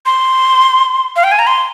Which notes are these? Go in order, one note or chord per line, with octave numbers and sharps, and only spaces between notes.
C6
F5
G5
G#5
A#5
C6